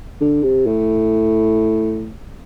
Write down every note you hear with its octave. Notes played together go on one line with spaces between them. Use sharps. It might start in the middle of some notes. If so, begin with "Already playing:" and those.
D3
C3
A2